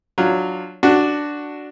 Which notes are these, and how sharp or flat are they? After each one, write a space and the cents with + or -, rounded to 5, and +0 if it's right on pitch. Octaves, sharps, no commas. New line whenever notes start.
F#3 +0 D4 +10 F4 +0
D4 +0 F#4 +0 A4 +10